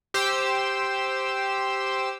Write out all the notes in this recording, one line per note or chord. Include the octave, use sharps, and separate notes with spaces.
G4 C5 E6